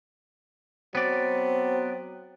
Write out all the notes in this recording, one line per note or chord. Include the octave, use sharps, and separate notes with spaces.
F#3 B3 C4 D5